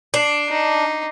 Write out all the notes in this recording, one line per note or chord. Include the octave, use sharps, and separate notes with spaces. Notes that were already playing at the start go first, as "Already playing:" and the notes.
D4 D6 C7
D#4